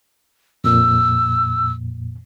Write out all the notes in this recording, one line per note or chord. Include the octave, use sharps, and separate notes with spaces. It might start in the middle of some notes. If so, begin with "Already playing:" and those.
F2 A#2 E6